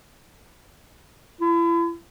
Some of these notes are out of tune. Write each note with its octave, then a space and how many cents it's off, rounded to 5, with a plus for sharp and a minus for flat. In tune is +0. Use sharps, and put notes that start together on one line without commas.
E4 +35